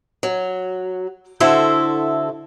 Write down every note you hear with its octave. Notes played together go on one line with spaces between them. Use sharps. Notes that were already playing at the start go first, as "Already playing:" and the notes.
F#3
D3 E4 F#4 A4 C5 E5